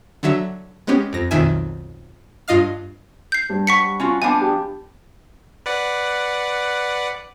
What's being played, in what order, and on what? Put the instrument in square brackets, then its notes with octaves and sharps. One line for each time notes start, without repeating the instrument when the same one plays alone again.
[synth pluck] D3 F#3 E5
G#3 B3 C#4 G4
F2 A#6
B1 F2 D#3 E5 G#5
G2 F4 D#5 F5 F6
[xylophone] G6 C7
[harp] G2
[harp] D5 F#5 B5 [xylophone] C#6 B6 C#7
[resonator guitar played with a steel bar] C#4 F4 F#4
[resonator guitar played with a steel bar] F3 B3 D4 [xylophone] G#5
[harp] G4
[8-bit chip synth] B4 D5 F#5